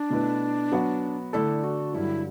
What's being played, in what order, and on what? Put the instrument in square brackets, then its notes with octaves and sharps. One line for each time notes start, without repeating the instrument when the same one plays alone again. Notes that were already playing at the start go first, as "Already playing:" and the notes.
Already playing: [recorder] D4
[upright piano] B2 A3 E4 B4
F#3 B3 F#4
[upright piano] D3 A3 D4 A4 [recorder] E4
[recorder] F#4
[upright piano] G2 D3 F#3 [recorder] E4